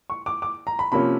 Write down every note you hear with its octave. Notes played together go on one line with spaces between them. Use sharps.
C#6
D6
D6
A#5
B5
C3 F3 A#3 C#4 B5